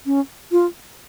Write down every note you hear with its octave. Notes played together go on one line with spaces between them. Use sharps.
C#4
F4